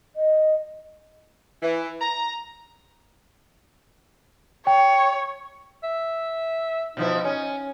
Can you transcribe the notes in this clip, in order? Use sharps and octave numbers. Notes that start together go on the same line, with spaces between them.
D#5
E3
A#5
C#5 G5
E5
B2 F3 D#4 E4
C#4